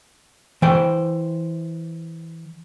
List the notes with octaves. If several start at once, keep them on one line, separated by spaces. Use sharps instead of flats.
E3 C5 G5